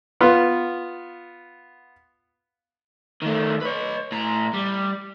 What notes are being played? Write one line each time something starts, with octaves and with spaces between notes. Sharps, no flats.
B3 F4
D#3 A3
B4 C#5
A2 A#5
G3